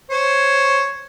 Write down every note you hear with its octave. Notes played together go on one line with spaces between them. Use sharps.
C5 C#5